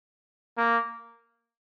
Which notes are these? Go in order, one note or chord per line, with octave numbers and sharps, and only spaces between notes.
A#3